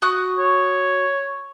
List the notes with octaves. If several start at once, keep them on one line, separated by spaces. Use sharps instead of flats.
F#4 D#6 F#6
C#5